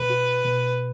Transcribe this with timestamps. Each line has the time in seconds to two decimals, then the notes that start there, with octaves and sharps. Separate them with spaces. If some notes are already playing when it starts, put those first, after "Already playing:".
Already playing: B2 B4
0.10 F#4
0.45 B2